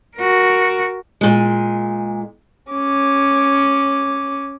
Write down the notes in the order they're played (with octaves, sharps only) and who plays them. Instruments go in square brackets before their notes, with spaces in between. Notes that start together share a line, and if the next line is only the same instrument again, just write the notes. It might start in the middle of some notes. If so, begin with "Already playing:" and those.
[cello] F#4 A#4
[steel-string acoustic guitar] A#2 G#3
[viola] C#4 D6